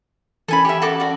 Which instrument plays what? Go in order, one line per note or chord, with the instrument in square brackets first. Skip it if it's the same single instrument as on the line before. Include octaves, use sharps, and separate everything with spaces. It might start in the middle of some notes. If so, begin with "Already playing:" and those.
[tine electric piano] E3 C#4 [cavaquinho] A4 G#5 B5
[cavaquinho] G4 E5
F#4 A4 D6
F#4 D5